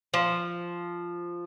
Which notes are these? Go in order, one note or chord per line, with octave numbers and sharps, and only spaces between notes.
F3